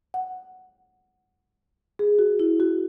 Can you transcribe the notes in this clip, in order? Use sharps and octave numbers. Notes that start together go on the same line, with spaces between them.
F#5
G#4
F#4
E4
F#4